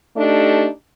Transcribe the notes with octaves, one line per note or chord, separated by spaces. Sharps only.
A3 D4 D#4 G4